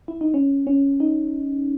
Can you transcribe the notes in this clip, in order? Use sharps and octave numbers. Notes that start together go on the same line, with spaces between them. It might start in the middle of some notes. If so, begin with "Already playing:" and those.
E4
D#4
C#4
C#4
D#4